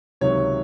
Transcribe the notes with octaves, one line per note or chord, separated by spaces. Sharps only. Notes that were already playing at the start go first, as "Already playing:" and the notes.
C#2 C3 D#3 F#3 C#5